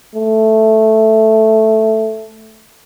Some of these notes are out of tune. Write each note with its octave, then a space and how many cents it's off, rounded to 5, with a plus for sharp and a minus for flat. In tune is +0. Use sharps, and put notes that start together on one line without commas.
A3 +0